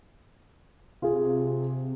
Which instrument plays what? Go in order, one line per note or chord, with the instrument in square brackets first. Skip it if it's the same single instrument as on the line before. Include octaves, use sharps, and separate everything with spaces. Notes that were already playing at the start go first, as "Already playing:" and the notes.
[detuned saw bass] C3 [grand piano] F4 G#4